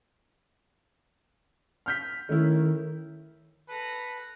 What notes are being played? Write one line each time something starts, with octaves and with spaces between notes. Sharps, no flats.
F6 G6 B6
D#3 A3 C#4 E4
A4 B4 A#5